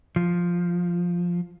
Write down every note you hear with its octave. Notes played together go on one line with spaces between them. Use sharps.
F3